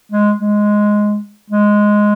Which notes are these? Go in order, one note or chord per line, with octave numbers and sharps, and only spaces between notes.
G#3
G#3
G#3